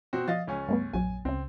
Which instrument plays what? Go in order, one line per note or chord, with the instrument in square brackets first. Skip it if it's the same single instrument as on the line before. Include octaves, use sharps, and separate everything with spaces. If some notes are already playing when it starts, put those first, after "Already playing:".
[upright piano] B2 C4 F#4
[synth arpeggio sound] F3 [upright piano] D#5 F5 A6
[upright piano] C#2 C#4 G#5
[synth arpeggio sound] G2 A3 B3
[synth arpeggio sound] A#1 F#2 F#3 [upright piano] G#5
[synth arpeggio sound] C#2 C#3 [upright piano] C4